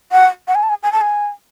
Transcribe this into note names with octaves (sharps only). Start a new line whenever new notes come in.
F#5
F#5
G#5
A5
G#5
G#5
A5
G#5